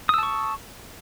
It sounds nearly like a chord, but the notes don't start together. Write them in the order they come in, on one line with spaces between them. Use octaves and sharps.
D#6 E6 A5 C#6